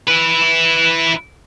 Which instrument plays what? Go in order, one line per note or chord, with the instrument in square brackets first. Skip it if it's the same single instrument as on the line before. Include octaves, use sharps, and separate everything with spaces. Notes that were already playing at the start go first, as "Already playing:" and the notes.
[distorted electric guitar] E4 B4